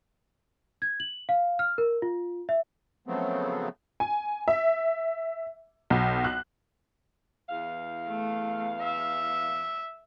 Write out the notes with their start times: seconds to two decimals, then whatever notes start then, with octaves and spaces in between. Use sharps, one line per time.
0.82 G#6
1.00 F#7
1.29 F5
1.59 F6
1.78 A#4
2.02 F4
2.49 E5
3.07 C#3 F3 F#3 A3 B3 C4
4.00 G#5
4.48 E5
5.90 B1
6.24 F#6
7.49 E2 F5
8.07 A3
8.82 E5